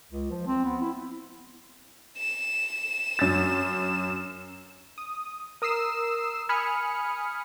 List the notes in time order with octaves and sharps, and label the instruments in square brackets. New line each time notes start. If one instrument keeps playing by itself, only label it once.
[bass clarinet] C#2
F3
C4
B3
E4
[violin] E7
[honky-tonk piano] F#2 A6
[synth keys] D#6
A#4 D#6 E6 C7 E7
G#5 B5 D#6 F6 C#7